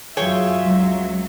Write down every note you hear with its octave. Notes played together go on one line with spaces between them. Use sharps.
F#2 F#3 F4 G#4 C#5 E5 G5
C#2 F#3